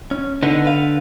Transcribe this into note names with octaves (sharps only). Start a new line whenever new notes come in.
C#4
D3 B3 D#4
B4 F5